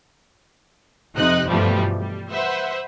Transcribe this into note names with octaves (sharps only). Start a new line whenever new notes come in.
F2 C3 D#4 D#5 F#6
G2 B2 E3 F3 G3 A3
G3
B4 C5 E5 F#5